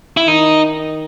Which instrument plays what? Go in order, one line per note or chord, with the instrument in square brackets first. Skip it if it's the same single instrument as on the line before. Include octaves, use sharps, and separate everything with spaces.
[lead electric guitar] E4
[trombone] D#3 [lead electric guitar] D#4